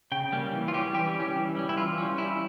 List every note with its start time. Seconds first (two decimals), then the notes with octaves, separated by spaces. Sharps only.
0.12 C#3 G5
0.32 G3 A#3 C#4
0.53 E3
0.68 F4
0.74 G3 C#4 G4
0.94 E3 G4
1.15 G3 C#4
1.36 E3
1.56 G3 C#4
1.69 E4
1.77 E3 F4
1.98 G3 C#4
2.18 G3 E4